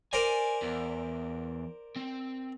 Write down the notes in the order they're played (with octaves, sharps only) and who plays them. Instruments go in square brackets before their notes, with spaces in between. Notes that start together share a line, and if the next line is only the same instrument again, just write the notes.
[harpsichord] A#4 C5 D5 [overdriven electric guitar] G#5
[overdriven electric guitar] E2
C4